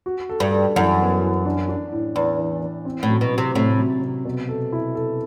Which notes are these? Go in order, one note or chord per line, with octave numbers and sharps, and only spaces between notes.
F#4
A4
G2
A4
F#2 E3
B3
E3
D4
D4
A2
E2 A2
E3
E3
C4
A2
F#3
B2
F#3
C3
A2 C3
F#3
C3
B2
A4
E4
A4